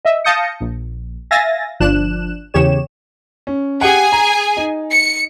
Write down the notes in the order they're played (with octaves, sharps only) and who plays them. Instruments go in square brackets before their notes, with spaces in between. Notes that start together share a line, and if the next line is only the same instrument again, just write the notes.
[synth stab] D#5 E5
F5 A5 D#6 G6 A#6 C#7
A#1
E5 F5 G#5 A6 A#6
G1 F3 D4 F#6 E7
E2 C#3 G4 C#5 E7
[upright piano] C#4
[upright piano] G4 F#5 [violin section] G#4 G#5
[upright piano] A#5
D#4
[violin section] C#7